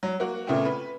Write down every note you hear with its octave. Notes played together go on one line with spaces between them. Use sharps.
F#3
A#3 F#4
A#2 C#3 A3 B3 C4
B4